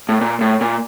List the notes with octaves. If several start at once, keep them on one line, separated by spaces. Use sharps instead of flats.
A2
A#2
A2
A#2